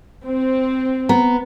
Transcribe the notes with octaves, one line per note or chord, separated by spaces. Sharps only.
C4
B3 A#5